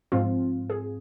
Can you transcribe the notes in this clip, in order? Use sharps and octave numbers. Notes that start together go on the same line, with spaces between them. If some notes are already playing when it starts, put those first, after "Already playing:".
G#2 F3 C4 F4
G#4